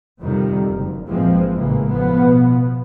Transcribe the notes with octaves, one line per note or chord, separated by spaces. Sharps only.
F2 C3 D#3 G3
F#1
A#1 G#2 E3 F3 G#3 C4
A1 A#2 C#3 E3 G#3 A#3
B2 F3 B3